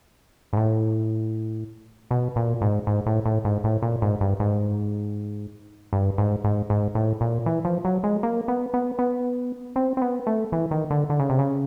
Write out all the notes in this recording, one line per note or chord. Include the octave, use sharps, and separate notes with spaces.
G#2
A2
B2
A#2
G#2
G#2
A2
A2
G#2
A2
A#2
G#2
G2
G#2
G2
G#2
G#2
G#2
A2
A#2
E3
F3
F#3
G#3
A#3
B3
B3
B3
C4
C4
B3
A3
E3
D#3
D3
D3
C#3
C3
C#3